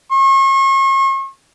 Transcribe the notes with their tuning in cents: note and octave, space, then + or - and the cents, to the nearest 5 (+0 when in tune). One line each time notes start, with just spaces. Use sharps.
C#6 -40